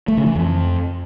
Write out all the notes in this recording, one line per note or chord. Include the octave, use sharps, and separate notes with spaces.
A3
C#3
E3
F2